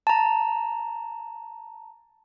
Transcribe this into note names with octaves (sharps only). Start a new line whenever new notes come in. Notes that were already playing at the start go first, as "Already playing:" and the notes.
A5 A#5